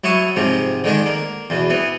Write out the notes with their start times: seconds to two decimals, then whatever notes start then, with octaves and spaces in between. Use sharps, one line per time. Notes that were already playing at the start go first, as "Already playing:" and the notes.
0.04 F#3 E4 A5 C#6 D#6
0.36 G#2 C3 F3
0.84 D3 D#3 G#3 D4
1.06 A#3
1.50 E2 B2
1.70 E3 B3